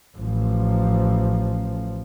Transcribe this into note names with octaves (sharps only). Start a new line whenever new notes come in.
A1 F3